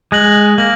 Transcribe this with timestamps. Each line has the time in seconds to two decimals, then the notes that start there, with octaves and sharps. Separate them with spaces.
0.12 G#3 F#6 A#6 F#7
0.58 A#3 A#6 F#7